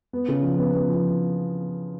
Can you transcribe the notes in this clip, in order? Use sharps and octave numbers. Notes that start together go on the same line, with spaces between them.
B3
C#3
F3
B3
B3
F3